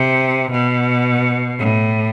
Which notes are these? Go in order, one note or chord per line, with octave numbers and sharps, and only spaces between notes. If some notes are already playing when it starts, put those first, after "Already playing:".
Already playing: C3
B2
A2